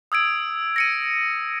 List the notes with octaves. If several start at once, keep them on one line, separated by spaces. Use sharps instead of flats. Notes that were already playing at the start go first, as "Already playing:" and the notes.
D#6 E6 G#6 D7
A#6 C#7 D#7